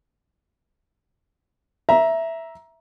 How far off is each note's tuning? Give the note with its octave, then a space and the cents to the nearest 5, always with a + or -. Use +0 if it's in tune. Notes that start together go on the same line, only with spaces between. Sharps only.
E5 +0 A#5 +15